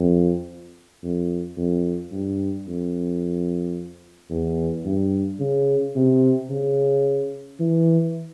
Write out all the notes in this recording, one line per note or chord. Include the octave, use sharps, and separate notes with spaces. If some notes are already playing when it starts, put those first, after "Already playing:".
Already playing: F2
F2
F2
G2
F2
E2
G2
C#3
C3
C#3
E3